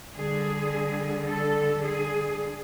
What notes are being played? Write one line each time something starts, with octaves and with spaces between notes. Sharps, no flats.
D3 G3 G#4
A4
G#4